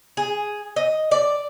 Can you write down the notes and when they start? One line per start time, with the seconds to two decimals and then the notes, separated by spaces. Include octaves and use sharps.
0.17 G#4
0.76 D#5
1.11 D5